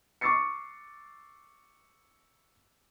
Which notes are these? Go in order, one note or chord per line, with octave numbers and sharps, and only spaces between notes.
C#6 D6 E6 A6 C7 C#7